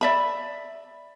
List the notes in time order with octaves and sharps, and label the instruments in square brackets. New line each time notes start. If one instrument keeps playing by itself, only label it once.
[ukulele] D5 E5 B5